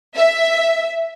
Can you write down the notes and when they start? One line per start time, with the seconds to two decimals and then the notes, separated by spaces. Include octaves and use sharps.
0.17 E5